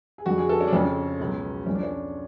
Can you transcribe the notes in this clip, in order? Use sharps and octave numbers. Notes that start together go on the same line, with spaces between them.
G#4
F2 D3 F3 F#4
G#4
A4
C#4
D4
F2 C#3 F3 C#4
C#2 B2 F#3
F2 F3 C#4 D4
C#4